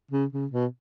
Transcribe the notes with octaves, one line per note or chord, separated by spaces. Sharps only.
C#3
C#3
B2